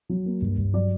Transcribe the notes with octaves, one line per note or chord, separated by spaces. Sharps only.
F#3
A#3
G2
G2
F#3 D5